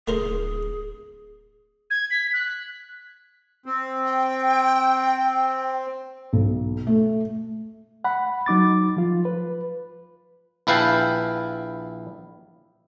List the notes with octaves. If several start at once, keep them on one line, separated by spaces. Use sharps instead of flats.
D1 A3 G#4 A#4 C5
G#6
B6
F#6
C4
G5
B1
A3
F#5 B5
F#3 D#4 D6 A6
F3 F4
B4
A#1 E4 B4 F5 G5 A5